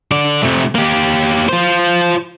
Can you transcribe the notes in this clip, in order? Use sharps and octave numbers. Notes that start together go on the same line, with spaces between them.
D3 D5
C3 A3
A#3 G4
F4 C5